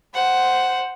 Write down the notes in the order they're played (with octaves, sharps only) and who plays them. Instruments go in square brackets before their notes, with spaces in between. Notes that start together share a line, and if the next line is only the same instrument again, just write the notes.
[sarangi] C5 [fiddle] F#5